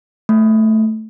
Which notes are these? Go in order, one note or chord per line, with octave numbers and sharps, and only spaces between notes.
A3